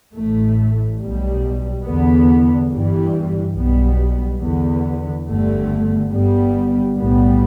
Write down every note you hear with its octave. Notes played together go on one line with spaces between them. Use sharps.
A1 A2 A3
B1 B2 G3
E2 D3 B3
G1 G2 E3 G3
B1 B2 G3 B3
E2 D3 B3
G1 G2 D3 A3
G1 G2 G3 B3
B1 A2 G3 B3